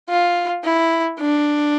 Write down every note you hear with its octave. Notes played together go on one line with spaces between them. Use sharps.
F4
E4
D4